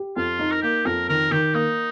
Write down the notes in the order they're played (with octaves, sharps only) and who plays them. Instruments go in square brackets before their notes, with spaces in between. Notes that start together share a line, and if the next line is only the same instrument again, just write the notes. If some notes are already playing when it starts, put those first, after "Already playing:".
Already playing: [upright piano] G4
[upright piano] F2 [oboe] F4
[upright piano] D#4
[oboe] A#4
[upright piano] A#3 [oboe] G4
[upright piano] F2 [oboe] A#4
[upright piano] D#3 [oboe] A#4
[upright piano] D#3 [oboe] G4
[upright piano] A#3 [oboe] D#4